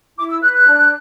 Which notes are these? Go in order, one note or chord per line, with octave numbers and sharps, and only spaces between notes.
E4 D6
E6
B4 F#6
F#6
D4